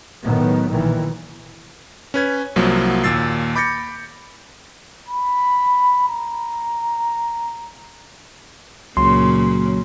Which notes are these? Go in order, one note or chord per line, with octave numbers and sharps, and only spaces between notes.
A2 D#3 F#3 B3
B1 A#2 D#3 E3
C#4 B4 G#6
C2 F3 F#3 A#3
D#2 A#2 E6 A6 C7
B5 D6 G6 A6 A#6 C#7
B5
A#5
C#2 A#2 C#3 F#3 A#3 C6